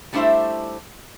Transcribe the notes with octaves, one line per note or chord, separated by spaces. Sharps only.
G3 A3 D4 E4 C5 E5